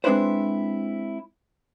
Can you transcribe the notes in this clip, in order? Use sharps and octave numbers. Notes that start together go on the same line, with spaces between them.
G#3 C4 D4 E4 B4 C5